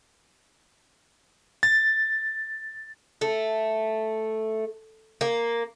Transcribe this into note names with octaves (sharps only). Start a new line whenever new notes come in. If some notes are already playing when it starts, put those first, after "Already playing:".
A6
A3
A#3